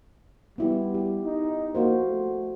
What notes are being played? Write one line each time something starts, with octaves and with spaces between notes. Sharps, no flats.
G3 B3 E4 G4
G4
D#4
A#3 F4 F#4 C5
A3